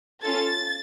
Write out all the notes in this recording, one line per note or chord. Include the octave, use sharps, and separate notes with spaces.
C#4 F4 A4 A6